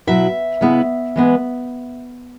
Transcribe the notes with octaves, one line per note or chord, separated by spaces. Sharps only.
B2 F#3 E4 E5
C#3 G#3 B3 E4
E3 G#3 B3